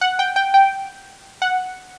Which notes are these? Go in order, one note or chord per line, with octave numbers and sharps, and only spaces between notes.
F#5
G5
G5
G5
F#5